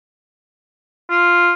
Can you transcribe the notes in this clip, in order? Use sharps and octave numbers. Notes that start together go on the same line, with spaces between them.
F4